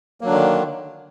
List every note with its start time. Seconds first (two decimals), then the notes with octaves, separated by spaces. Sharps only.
0.21 A#3
0.24 F#3
0.26 D4
0.29 D3
0.32 D#3